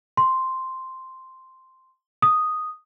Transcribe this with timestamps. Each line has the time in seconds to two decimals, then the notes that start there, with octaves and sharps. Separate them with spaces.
0.17 C6
2.22 D#6